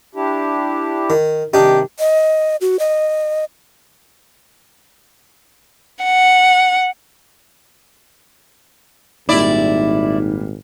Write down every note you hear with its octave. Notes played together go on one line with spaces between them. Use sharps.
D4 E4 G4
D#3
C3 D#3 G3 D4 D#4 G4
D#5
F#4
D#5
F#5
G#1 A#2 G3 D#4 E4 D5